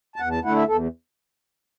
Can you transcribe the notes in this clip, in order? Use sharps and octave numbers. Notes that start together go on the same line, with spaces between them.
A5
E2 F#5
A5
D3 A3 E4 F#5
E5
E2 A4